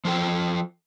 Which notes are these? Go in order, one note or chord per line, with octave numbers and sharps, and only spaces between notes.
F3 F4 A4 G5